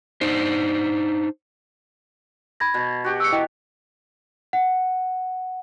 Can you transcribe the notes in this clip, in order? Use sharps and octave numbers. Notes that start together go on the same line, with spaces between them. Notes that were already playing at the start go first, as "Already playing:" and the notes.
D4 D#4 C5
B5 G#6 A#6
B2
F#4 G4
E6 C#7
E4 D#5 G5
F#5